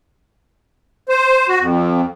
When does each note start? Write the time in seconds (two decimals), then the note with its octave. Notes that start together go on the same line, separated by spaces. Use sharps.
1.09 C5
1.48 F#4
1.60 F2